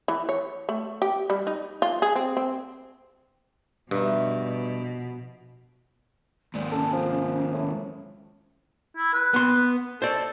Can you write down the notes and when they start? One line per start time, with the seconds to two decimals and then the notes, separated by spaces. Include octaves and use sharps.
0.08 E3
0.29 C#5
0.69 A3
1.02 G4
1.30 G3
1.47 D#4
1.82 F4
2.02 G#4
2.16 C4
2.37 C4
3.91 G2 B2 F3 D#4 E4
6.54 D#2 G#2 D5
6.72 C#4 A4
6.92 F3
7.53 A2
8.97 E4
9.13 B4
9.34 B3 C6
10.02 A4 C5 D5